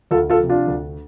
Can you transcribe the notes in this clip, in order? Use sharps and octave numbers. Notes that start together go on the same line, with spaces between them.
D2 F4 A4
F4 A4
C3 F3
D4 F4
D2